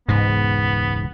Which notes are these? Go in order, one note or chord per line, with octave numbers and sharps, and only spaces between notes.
E1 C#2 G#2 B2 B3